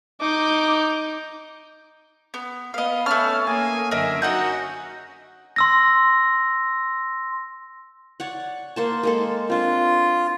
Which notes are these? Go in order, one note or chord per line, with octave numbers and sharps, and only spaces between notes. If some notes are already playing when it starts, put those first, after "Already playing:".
D#4 D6 G6
B3
B3 D#5 F5
A3 C#4 A5 F6
A#3 G#4 G#5
F#2 D3 A#4 D#5 E5
D#4 F#4 D#5 F#5 G6
C6 E6 A#6
C#5 D5 F#5
A#3 C5 A5
G#3 A#3 A4
C4 D4 F4